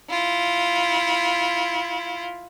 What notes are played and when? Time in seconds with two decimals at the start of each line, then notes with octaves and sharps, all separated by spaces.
0.10 E4 F4